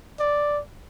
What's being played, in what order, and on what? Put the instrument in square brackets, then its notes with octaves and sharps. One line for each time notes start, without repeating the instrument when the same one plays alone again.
[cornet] D5